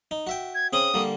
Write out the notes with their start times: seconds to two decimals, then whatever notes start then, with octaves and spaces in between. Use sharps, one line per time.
0.11 D#4
0.27 F#4 E5 G5
0.55 G#6
0.73 C#3 C4 C#4 D#6
0.94 D3 G3 A#3